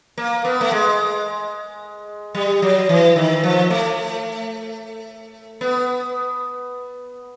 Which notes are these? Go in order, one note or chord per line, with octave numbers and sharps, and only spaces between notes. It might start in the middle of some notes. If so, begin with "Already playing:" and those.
A#3
B3
A3
G#3
G3
F#3
E3
D#3
F3
A3
B3